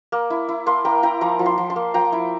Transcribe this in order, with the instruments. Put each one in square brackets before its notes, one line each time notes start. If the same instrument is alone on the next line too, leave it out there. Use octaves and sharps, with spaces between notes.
[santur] A#3
E4
E4
A#3 A5 C6
A#3 G5 A#5
E4 G5 A#5
F3 A#5 D6
F3
A5 C6
F3
A5 C6
A#3
F3 G5 A#5
E4